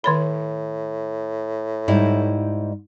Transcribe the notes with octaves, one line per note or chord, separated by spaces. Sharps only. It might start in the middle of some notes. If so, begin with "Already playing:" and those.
A2 D#3 C#5 B5
G#2 G3 E4